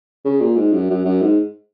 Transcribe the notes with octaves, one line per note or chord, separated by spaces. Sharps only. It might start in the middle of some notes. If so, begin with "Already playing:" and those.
C#3
A#2
G#2
F#2
F#2
F#2
G#2